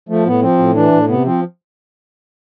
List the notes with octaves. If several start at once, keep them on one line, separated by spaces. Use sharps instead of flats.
F3 A3
A2 B3
F3 C4
A2
E3 D4
A2
C3 B3
F3 C4